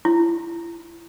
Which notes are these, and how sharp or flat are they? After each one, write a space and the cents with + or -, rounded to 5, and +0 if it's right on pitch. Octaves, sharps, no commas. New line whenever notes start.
E4 +35